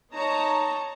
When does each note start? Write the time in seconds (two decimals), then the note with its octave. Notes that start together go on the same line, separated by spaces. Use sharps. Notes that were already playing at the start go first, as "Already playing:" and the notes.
0.14 D#4 C#5 A5 A#5